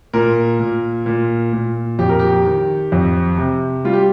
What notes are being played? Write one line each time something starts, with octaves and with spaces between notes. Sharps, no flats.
A#2 A#4
A#2
A#2
A#2
F2 G4
A#4
G4
D#3
F2
C3
G3 F4
G4